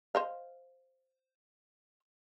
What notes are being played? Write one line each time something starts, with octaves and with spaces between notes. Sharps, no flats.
C5 D#5 F5